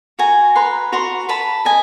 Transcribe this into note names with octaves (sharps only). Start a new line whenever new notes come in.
F#4 G#5 A#5
B4 A#5 C6
F#4 A#5 C6
B4 A5 B5
D#5 G#5 A#5